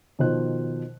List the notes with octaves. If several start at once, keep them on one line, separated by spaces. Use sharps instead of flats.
B2 D#3 F3 C5 F#6